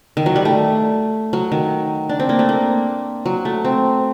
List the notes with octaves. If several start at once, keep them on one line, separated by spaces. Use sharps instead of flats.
D#3
F#3
G3
A3
F#3
D#3
D4
C4
A#3
A3
A#3
F#3
A3
C4